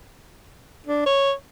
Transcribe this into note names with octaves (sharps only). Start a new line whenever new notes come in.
D4
C#5